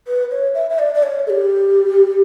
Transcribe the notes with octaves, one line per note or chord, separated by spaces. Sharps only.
B4
C#5
E5
E5
D5
D5
C#5
A4
G4